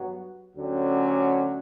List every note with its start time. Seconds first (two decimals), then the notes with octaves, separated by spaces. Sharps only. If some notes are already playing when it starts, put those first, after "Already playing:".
Already playing: G2 F#3 B3 F#4
0.56 D2 D3 F#3 C#4 G4